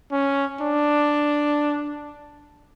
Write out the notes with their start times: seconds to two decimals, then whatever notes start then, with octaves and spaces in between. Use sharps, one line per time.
0.12 C#4
0.61 D4